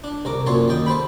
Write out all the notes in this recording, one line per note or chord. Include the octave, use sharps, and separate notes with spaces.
D4
C2 A#4 D6
F#2 A#2 A4 C#5 C6
D#2 D#3 D5 G5 D#6
A4 C5 G5 B5